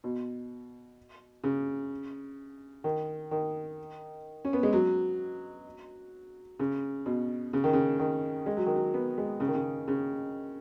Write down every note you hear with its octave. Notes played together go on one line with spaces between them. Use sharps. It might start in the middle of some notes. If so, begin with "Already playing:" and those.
B2
C#3
D#3
D#3
C#4
B3
G#3
F#3
C#3
B2
C#3
D#3
C#3
D#3
G#3
F#3
D#3
F#3
B3
G#3
C#3
D#3
C#3
C#3